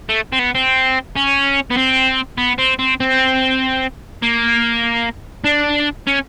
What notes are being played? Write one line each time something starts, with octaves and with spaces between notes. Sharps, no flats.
A3
C4
B3
C4
C#4
B3
C4
B3
C4
C4
C4
A#3
D4
C#4